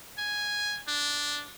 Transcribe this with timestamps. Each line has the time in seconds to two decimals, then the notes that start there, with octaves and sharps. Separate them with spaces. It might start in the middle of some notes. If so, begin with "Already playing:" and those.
0.18 G#5
0.88 D4